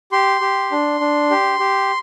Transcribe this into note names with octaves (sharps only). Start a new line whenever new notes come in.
G4 C6
G4
D4
D4
G4
G4